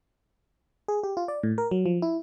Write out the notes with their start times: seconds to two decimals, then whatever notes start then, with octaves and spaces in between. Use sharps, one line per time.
0.88 G#4
1.03 G4
1.17 F4
1.28 D5
1.43 A2
1.58 A#4
1.71 F#3
1.86 F3
2.02 E4